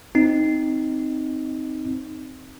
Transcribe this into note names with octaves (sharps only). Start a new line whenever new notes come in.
C4 D#4